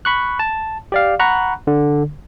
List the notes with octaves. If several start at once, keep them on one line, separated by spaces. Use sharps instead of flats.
B5 C#6 F#6
A5
G4 D5 F5
F#5 A#5 B5 C#6 F#6
D3